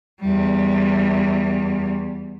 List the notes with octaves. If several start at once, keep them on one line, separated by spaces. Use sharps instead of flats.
E2 G3